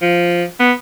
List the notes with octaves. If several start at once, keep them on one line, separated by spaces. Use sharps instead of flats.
F3
B3